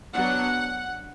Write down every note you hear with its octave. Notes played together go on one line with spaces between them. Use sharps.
F#3 B3 D4 F#5